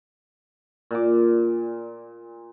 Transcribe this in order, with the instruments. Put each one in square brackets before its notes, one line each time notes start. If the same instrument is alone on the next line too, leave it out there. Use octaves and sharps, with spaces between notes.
[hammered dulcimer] A#2 D6